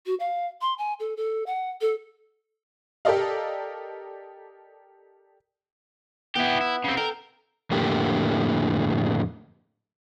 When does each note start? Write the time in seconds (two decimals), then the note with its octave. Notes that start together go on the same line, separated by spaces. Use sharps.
0.06 F#4
0.20 F5
0.61 C6
0.78 G#5
1.00 A4
1.17 A4
1.46 F#5
1.81 A4
3.05 G4 A4 A#4 D5 D#5 F5
6.36 B3 E4 G4
6.61 E4
6.84 C#3 C4
6.97 A4 A#4 F5 G5
7.71 F2 A2 D3 A#3 G4